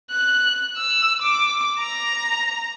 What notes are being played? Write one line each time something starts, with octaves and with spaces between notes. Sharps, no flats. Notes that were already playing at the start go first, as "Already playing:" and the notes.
F#6
E6
D6
A#5